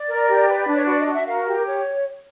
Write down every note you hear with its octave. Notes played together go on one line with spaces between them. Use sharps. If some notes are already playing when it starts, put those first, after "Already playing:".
Already playing: D5
A#4
G4
B4
D4
C#5
F#4 D5
D#5
F#4
E5
A#4 F5
G4
C#5